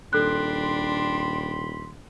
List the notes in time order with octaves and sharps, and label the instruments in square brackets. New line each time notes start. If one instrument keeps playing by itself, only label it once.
[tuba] D#1 [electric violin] D4 [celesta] A4 F#6 [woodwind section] G5 B5 C6